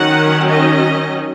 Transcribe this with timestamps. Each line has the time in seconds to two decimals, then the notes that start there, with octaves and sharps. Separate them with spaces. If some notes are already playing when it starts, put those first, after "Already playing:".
Already playing: D#3 F#3 C#4 F#5
0.49 D#5